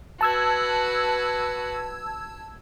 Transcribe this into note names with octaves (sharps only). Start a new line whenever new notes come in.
F#4 B4 A5 E6 G#6